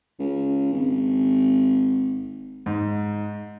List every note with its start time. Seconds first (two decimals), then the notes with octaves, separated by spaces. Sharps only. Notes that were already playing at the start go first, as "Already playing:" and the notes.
0.19 C#2
0.73 G#1
2.66 G#2